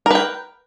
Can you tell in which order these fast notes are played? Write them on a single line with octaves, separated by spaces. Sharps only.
A#4 B4 G5